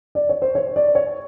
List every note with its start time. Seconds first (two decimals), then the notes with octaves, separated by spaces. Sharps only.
0.15 D5
0.29 C#5
0.42 C5
0.55 C#5
0.76 D5
0.95 C#5